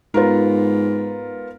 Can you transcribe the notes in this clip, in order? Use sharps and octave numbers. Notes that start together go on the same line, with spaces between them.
G#2 B3 F4 A#4